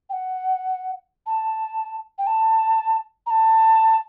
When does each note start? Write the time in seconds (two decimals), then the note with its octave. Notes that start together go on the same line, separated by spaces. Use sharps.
0.10 G5
0.13 F#5
1.26 A5
2.18 G5
2.27 A5
3.26 A#5
3.30 A5